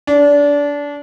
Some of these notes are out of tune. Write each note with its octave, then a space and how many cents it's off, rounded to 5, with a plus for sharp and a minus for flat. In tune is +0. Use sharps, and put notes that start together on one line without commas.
D4 -25